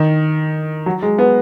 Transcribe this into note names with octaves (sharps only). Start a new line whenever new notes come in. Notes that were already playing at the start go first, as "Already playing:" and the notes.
Already playing: D#3
F#3
G#3
B3